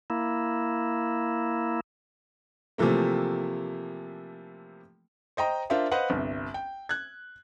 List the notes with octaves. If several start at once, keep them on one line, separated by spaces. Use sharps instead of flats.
A#3 E4
C3 E3 F3 A3 A#3
C5 D#5 G5 A#5
D4 F4 A#4 C5 E5 F5
B4 C5 D#5 F5 F#5
G1 C2
G5
F#6 G#6